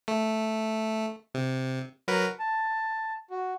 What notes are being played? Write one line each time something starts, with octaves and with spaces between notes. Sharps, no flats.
A3
C3
F#3 A#4 B4
A5
F#4